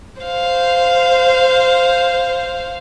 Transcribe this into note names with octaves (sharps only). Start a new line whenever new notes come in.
C5 F5